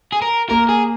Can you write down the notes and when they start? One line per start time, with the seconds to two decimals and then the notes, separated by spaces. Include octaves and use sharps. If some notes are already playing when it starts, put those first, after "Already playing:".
0.12 G#4
0.22 A#4
0.50 A#3 A#4
0.69 G#4